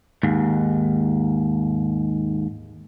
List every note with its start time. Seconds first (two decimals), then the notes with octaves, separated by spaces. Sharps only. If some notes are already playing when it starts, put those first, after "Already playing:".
0.23 D#2 G#2